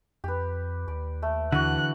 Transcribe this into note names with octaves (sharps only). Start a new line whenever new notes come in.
F2 G4 B4
D#2 D5
A3
D3 E3 F#4 F#5 F#6